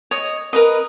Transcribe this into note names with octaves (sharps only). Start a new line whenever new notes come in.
C#5 D#5 D#6
A#4 B4 D#5